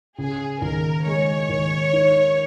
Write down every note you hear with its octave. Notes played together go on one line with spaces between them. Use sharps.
C#3 G#4
D#2 A#4
G#3 C#5
D#2
D#3